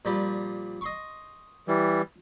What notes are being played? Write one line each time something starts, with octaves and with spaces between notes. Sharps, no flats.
A#2 F3 G3
D#5 C6 C#6
E3 G3